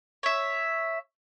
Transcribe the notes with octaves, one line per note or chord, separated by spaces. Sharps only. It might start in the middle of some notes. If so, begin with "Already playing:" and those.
C#5 E5